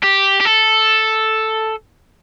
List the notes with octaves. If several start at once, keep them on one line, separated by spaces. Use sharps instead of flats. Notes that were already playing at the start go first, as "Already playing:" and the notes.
G4
G4
A4